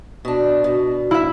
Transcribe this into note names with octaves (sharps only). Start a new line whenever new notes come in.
B2 D4
B2
E4 E5